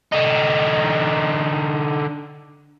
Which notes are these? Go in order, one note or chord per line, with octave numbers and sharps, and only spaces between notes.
D3 D#4